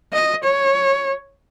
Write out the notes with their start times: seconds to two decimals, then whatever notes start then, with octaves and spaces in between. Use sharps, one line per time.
0.13 D#5
0.44 C#5